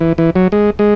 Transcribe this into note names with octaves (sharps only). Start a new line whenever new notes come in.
E3
E3
F#3
G#3
G#3